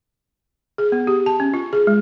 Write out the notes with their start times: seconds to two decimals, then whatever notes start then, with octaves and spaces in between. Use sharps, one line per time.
0.78 G#4
0.92 B3
1.07 G4
1.26 A5
1.40 C#4
1.54 F4
1.73 G#4
1.87 G#3